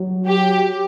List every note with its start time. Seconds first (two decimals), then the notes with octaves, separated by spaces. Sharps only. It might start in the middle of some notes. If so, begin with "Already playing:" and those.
Already playing: F#3
0.27 G4